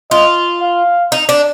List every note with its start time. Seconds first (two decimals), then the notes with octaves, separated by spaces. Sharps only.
0.11 F4 D#5
0.62 F5
1.12 D#4
1.29 D4